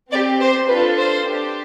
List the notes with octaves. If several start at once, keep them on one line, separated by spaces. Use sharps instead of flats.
C4 G4 D5
C5
D4 F4 A4 B4
C5
D4 G4